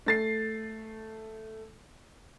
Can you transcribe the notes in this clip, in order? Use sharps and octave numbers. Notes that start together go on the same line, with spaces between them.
A3 A6 C7